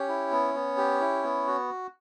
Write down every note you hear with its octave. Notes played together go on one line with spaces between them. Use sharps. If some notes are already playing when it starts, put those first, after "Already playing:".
Already playing: C#4 G4 C#5
E4
B3
B3
G4
E4
B3
F#4